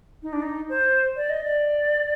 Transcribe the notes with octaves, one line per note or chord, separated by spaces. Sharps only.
D#4
D4
D#4
C5
D5
D#5
D5